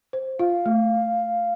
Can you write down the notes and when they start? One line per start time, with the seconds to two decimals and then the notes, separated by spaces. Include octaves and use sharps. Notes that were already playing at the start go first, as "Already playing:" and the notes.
0.13 C5
0.39 F4 F5
0.66 A3